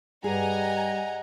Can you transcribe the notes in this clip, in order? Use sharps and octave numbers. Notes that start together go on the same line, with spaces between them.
G2 G3 G#4 D#5 F#5 G#5 A#5